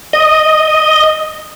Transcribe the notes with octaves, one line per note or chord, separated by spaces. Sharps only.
D#5